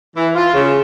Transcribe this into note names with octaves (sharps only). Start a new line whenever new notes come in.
E3
F4
C#3